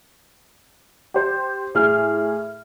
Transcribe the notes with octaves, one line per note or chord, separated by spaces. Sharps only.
G4 C5
A2 G#4 F6